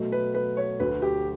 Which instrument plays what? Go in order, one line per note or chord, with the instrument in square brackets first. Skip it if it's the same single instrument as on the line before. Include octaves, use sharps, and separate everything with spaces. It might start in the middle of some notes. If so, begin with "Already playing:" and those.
Already playing: [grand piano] B2 F#3 A3
[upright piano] B4
B4
C#5
[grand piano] D2 D3 F#3 [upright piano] B4
[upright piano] G4